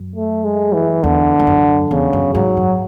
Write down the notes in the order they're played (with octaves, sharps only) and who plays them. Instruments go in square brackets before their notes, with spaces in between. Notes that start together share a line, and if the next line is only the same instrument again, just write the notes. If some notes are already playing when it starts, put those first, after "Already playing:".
Already playing: [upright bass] F#2
[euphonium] A3
G#3
E3
[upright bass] E2 [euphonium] D3
[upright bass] E2
F#2
[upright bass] E2 [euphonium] C#3
[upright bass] F#2
[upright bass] G#2 [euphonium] F#3
[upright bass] F#2